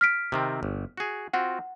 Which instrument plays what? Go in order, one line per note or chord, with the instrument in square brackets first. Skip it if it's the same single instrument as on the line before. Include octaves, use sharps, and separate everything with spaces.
[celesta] F6 B6 D7
[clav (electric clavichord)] C3 D#3 C4
G1
F#4 G#4
[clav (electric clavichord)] C4 F4 F#4 [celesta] F#5